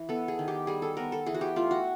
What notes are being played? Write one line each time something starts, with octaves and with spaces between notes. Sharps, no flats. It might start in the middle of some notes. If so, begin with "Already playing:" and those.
Already playing: E3
B3 A4
G#4
D#3
G4
G3 G#4
A4
B3 A#4
A4
E3 G#4
F#4
G4
A3 F4
F#4